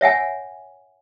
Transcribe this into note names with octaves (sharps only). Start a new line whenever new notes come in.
C#5 E5 F#5 G#5